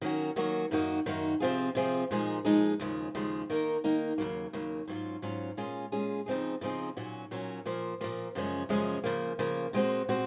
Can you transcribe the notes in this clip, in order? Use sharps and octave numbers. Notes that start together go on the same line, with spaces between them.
D#3 F#3 A#3 C#4 F#4
D#3 F#3 A#3 C#4 F#4
F#2 D#3 A#3 D#4 F#4
F#2 D#3 A#3 D#4 F#4
C3 F3 C4 F4 G#4
C3 F3 C4 F4 G#4
A#2 F3 G#3 D#4 G#4
A#2 F3 G#3 D#4 G#4
D#2 C#3 F3 G#3
D#2 C#3 F3 G#3
D#3 A#3 D#4 A#4
D#3 A#3 D#4 A#4
D#2 C#3 F#3 A#3
D#2 C#3 F#3 A#3
G#2 F#3 C#4 F4
G#2 F#3 C#4 F4
A#2 G#3 C#4 F4 G#4
A#2 G#3 C#4 F4 G#4
C#3 F3 C4 D#4 G#4
C#3 F3 C4 D#4 G#4
A#2 F#3 C#4 F#4
A#2 F#3 C#4 F#4
A#2 F3 A#3
A#2 F3 A#3
F#2 C#3 F3 G#3 C#4
F#2 C#3 F3 G#3 C#4
C#3 F3 A#3
C#3 F3 A#3
A#2 G#3 C4 F#4 C5
A#2 G#3 C4 F#4 C5